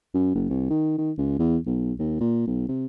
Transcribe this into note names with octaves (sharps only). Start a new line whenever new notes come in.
F#2
F#1
C2
D#3
D#3
C#2
E2
B1
D#2
A#2
B1
C3